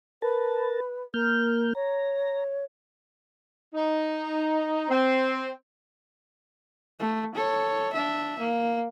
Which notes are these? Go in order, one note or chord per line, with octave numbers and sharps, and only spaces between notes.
A#4 B4 A5
A#3 A#4 F6 G6
C#5 A#5
D#4
C4
A3
A4 C#5
D4 E5
A#3